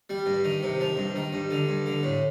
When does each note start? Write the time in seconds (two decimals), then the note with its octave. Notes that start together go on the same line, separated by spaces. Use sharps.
0.10 G3
0.26 G2
0.44 D#3
0.63 C3
0.80 F3
0.97 G2
1.16 D#3
1.33 G2
1.51 D3
1.69 G2
1.86 D3
2.03 A2